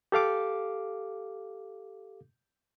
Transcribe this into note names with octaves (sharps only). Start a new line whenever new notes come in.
G4 A4 F5 D6